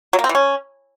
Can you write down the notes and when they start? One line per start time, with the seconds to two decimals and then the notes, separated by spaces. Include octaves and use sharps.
0.13 F#3
0.19 A#3
0.24 C4
0.29 E3
0.35 C#4